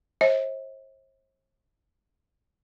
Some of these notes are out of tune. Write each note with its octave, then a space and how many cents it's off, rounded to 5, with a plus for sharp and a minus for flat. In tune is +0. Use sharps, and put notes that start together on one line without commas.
C5 +45 E5 -45